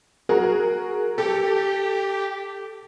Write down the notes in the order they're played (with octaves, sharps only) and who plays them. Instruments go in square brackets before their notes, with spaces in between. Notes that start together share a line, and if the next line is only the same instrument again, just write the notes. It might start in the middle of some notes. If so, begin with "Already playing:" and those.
[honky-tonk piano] F#4 G#4 A#4
[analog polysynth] G4 [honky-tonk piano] A4